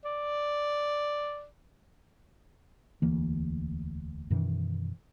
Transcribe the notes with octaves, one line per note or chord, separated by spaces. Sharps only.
D5
E1 D2 E3 A#3
F#2 B2 D#3 E3